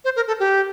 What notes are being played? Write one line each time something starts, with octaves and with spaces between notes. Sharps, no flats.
C5
A#4
A4
G4